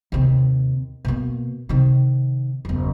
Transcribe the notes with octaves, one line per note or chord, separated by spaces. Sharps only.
D#2 C3
B2 A#3
C3 D#3
F#1 E2